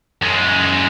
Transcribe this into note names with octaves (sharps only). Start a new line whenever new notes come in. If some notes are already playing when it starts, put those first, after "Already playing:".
F#2 G#3